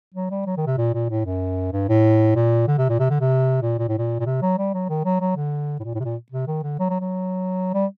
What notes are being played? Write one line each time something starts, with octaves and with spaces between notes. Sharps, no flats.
F#3
G3
F#3
D#3
C3
A#2
A#2
A2
F#2
G2
A2
A#2
D3
C3
A#2
C3
D3
C3
A#2
A#2
A2
A#2
A#2
C3
F#3
G3
F#3
D#3
F#3
F#3
D3
A2
A#2
A2
C3
A#2
C3
D#3
D3
F#3
F#3
F#3
G3